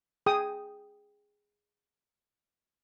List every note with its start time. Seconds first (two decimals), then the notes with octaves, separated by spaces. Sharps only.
0.26 G#4 G5 D#6